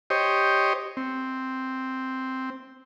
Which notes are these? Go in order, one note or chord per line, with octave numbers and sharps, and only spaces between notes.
G4 C5 C#5 D#5
C4